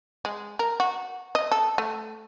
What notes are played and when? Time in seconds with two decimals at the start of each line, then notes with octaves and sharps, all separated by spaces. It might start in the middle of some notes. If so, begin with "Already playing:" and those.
0.25 G#3
0.59 A#4
0.80 F#4
1.35 D#5
1.52 A4
1.78 A3